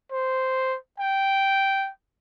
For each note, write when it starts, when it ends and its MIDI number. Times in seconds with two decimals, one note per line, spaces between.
0.12 0.76 72
0.99 1.90 79